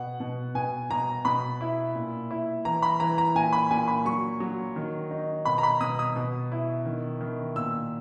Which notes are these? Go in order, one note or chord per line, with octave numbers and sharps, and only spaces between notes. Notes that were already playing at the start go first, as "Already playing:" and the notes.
Already playing: B2 F#5
B2
B2 G#5
B2 A#5
B2 B5
E4
A#2
E4
E3 A#5
B5
E3 A#5
A#5
A#2 G#5
B5
A#2 G#5
B5
F#3 C#6
F#3
D#3
D#4
B2 B5
A#5
B5
B2 D#6
D#6
B2
E4
D#3
D#3
A#2 E6